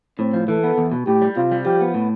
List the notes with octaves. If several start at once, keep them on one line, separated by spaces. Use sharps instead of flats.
A2 C4
F3
E3 A4
B3
E2
B2
A2 G4
G3
C3 F4
G3
F3 G4
B3
A2